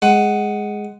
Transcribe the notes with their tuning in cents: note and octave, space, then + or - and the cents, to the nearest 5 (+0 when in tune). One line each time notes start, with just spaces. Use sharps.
G#3 +0 F#5 +10